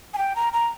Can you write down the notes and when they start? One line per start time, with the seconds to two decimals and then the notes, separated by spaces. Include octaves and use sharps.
0.14 G#5
0.18 G5
0.36 A#5
0.53 A#5